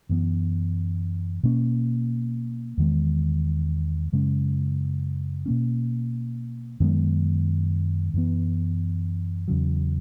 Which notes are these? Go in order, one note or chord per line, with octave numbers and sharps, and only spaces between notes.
F#2 E3 B3
B2 A#3 C#4
E2 D#3 G#3
F#2 C#3 G#3 C#4
B2 A#3 C#4
F#2 D#3 G#3 B3
F#2 E3 B3
E2 C#3 F#3